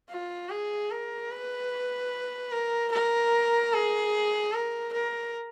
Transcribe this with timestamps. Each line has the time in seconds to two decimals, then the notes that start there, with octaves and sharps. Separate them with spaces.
0.10 F4
0.49 G#4
0.90 A#4
1.30 B4
2.52 A#4
2.92 A#4
3.73 G#4
4.53 A#4
4.93 A#4